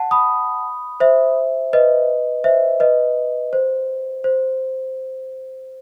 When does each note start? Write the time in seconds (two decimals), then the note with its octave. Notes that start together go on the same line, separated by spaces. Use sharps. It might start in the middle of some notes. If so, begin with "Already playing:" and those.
Already playing: F#5 A5
0.11 B5 D#6
1.00 C5 E5
1.73 B4 D#5
2.44 C5 E5
2.80 B4 D#5
3.53 C5
4.24 C5